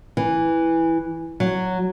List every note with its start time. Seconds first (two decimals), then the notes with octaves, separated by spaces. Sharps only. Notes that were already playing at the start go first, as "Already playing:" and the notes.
0.17 E3
1.40 F#3